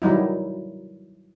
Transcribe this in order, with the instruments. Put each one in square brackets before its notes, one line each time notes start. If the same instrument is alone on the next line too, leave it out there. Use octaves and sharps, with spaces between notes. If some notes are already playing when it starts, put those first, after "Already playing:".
[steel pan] D#3 F#3 G3 D#4 E4